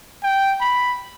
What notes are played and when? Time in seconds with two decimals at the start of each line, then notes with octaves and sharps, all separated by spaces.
0.23 G5
0.61 B5